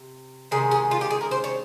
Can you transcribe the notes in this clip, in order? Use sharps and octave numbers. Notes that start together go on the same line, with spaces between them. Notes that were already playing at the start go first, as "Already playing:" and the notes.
Already playing: C3
C3 D#3 G#3 C#4 G#4
G#4
F4
G4
G#4
A#4
C5
C#5